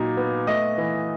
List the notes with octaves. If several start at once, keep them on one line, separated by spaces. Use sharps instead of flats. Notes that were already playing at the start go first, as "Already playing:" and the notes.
Already playing: A#2 F#3 D#4
B3
A3 D#5
E3